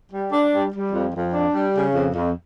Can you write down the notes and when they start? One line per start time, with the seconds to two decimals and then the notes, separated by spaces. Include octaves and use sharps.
0.12 G3
0.32 D4
0.53 G3
0.73 G3
0.92 F2
1.14 F2
1.33 D4
1.54 G3
1.74 C#3
1.94 F2
2.14 F2